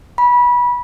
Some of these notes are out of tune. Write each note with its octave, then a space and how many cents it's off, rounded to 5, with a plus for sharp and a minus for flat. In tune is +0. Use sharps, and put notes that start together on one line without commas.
B5 -20